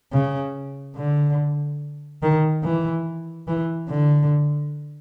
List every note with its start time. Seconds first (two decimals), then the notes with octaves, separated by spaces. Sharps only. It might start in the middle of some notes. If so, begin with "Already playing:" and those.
0.13 C#3
0.96 D3
2.22 D#3
2.63 E3
3.48 E3
3.89 D3